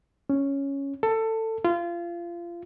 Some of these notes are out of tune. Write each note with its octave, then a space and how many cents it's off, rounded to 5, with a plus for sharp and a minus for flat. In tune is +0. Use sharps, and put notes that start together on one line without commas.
C#4 +0
A4 +20
F4 -25